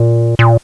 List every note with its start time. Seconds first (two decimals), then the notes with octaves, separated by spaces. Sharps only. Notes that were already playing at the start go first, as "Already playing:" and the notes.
Already playing: A#2
0.39 A#2